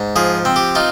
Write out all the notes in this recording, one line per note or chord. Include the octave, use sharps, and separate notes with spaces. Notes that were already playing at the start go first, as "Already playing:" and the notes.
Already playing: G#2
F3 G#4
C4
G4
D#4 F4